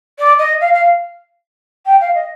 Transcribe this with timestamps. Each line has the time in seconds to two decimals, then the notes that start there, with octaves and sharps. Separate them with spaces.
0.19 D5
0.39 D#5
0.61 F5
0.74 F5
1.86 G5
2.01 F5
2.15 D#5